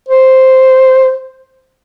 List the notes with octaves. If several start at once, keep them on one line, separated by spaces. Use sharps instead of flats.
C5